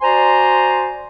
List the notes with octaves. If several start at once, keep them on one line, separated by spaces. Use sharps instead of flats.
F#4 C5 D5 G#5 A#5 C6